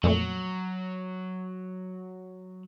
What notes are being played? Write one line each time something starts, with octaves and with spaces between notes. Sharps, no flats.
F2 A#2 F#3 A3